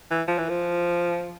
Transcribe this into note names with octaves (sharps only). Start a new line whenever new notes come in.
E3
F3
E3
F3